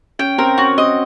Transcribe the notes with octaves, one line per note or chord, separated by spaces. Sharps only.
C#4 G5
C4 A#4
C#4 F#4
C4 D#5